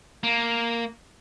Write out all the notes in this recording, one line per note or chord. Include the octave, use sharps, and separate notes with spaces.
A#3